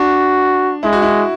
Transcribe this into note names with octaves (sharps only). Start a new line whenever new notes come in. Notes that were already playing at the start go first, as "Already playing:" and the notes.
Already playing: D4 F#4
G#3 E4
F#4
E4